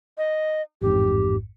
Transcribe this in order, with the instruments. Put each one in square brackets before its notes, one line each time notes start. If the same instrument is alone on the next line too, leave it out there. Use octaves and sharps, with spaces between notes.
[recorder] D#5
[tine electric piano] A1 F2 G#2 [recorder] G4